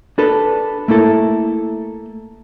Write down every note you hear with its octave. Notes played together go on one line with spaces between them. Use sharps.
D4 A4 B4
A3 A#3 E4 A4